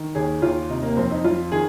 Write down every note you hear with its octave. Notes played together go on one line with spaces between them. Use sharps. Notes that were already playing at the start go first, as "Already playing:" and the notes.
Already playing: D#3
D#2 G#4
D#2 F4
C3 D#4
A#3
F2 C4
D#4
F2 F4
D#3 G#4